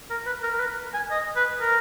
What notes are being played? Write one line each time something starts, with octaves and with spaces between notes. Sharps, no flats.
A#4
B4
A#4
A#4
B4
G#5
D#5
B4
A#4